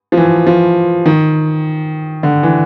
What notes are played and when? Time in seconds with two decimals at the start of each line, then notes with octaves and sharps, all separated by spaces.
0.12 F3
0.17 E3
0.47 F3
1.06 D#3
2.23 D3
2.43 E3